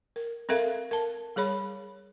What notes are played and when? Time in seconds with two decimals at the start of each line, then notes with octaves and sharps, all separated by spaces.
0.16 A#4
0.49 C4 A4 A#4 E5 F5
0.91 A#4 A5
1.36 G3 G#4 C#5 B5